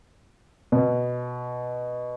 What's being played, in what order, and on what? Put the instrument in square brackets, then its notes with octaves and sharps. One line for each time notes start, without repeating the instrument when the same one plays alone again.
[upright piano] B2